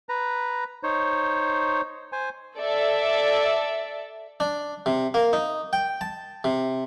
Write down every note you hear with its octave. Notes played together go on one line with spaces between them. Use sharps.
B4 A#5
D#4 C5 C#5
C5 G#5
A4 D5 E5
D4
C3
A#3
D#4
G5
A5
C3